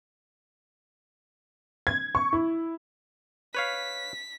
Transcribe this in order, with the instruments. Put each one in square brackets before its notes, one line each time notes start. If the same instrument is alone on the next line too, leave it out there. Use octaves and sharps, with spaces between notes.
[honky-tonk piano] G#6
C#6
E4
[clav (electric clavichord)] B4 C#5 F5 [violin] B6